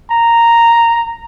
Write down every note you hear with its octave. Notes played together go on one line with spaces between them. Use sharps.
A#5